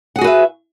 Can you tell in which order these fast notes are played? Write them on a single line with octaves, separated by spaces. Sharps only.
F#5 G#4 F#4 B4 E5